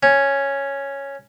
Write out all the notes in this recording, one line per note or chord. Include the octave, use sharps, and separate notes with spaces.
C#4